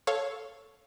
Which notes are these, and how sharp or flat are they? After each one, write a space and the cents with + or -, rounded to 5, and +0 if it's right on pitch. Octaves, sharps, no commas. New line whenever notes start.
A4 +0 C#5 +0 F5 +0